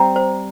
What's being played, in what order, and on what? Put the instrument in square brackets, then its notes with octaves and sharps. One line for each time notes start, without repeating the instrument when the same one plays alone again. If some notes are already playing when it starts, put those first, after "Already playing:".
Already playing: [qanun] G3 C4 [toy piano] A#5
[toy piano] C5